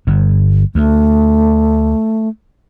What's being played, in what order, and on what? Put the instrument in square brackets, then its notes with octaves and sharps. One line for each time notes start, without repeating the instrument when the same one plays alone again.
[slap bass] G1 G2
[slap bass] D2 [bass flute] A3